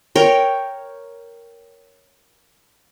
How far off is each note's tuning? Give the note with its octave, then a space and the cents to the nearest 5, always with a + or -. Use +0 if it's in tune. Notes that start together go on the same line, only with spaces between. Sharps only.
A#4 +0 C#5 +0 G5 +0